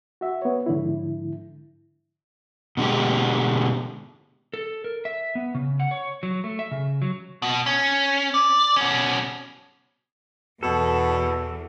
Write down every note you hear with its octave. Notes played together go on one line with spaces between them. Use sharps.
F#4 E5
B3 C#5
G#2 D3 F3 E4
B2 D3 G#3 G4
A4
A#4
E5
B3
C#3
F#5
C#5
F#3
A3
E5
C#3
F#3
B2
C#4
D5
B2 C#4
E2 B2 A4